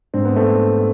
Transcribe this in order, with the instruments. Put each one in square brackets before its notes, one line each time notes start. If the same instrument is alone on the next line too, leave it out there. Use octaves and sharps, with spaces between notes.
[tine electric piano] G#2 G#3 D4 [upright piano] C4
[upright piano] B3
A3 C4